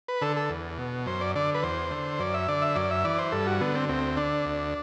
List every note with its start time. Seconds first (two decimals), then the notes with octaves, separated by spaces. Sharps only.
0.08 B4
0.21 D3 A4
0.37 A4
0.50 E2
0.78 B2
1.06 F#2 C5
1.21 D5
1.35 D3 D5
1.55 B4
1.63 E2 C5
1.91 D3
2.19 F#2 D5
2.34 E5
2.48 D3 D5
2.62 E5
2.76 F#2 D5
2.91 E5
3.04 E3 D5
3.19 C5
3.32 G2 A4
3.47 F#4
3.61 D3 B3
3.75 C4
3.89 D2 C4
4.17 D3 D4
4.46 D2